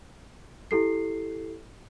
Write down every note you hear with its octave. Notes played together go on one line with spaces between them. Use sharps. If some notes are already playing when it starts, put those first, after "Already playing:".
E4 G4 A4 C7